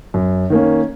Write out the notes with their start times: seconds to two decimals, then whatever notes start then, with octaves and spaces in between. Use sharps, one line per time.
0.14 F#2
0.50 D#3 A#3 C#4